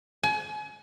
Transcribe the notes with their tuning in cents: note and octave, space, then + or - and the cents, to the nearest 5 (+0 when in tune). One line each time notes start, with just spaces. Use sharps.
G#5 +35